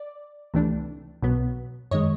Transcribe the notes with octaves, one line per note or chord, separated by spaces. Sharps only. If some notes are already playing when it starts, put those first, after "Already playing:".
Already playing: D5
C#2 C3 E3 A3 D4
B1 B2 F#3 B3
F#2 D#3 G#3 C#5 D#5